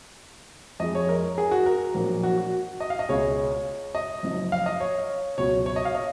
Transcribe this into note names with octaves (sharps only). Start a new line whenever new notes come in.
F2 F3 G#3 D#5
C#5
A#4
G#4
F#4
A#4
A#1 A#2 F#3
F#4
F#4
D#5
F5
D#5
C#2 B2 G#3 C#5
D#5
F#1 F#2 F3
F5
D#5
C#5
C#2 B2 F#3 C#5
C#5
D#5
F5
D#5